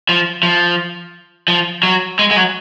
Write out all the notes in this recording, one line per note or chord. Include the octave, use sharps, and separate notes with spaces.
F3
F3
F3
F#3
G#3
G#3
F#3